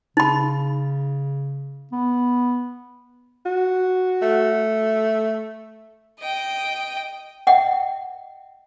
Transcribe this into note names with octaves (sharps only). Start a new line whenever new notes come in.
C#3 D#4 B5
B3
F#4
A3
D#5 G5
D#5 E5 F#5 G5